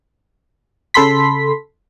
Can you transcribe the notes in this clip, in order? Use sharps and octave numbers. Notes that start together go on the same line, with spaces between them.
C#3 A4 B5 C6 B6